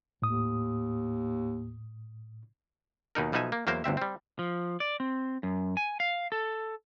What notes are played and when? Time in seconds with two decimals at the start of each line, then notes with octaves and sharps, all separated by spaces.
0.22 D#2 A2 D#6
3.15 D#2 B2 D#4 A#4
3.32 B1 B2 F3 D#4 E5 G#5
3.52 A#3
3.67 E2 F#3 A#3 A#4 C5
3.84 G1 D2 C4 E5
3.97 G3 C4
4.39 F3
4.80 D5
5.00 C4
5.43 F#2
5.77 G#5
6.00 F5
6.32 A4